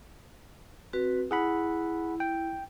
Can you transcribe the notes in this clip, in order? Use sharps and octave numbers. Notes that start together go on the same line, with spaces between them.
C4 F#4 B4
E4 G#4 F#5 B5
G5